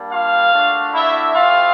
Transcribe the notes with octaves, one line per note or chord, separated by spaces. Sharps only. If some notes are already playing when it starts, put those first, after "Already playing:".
Already playing: G3 A#3 D4
F4 F5
A3 D4 F#4
E4 E5
A3 C4 E4 F4 G4 F5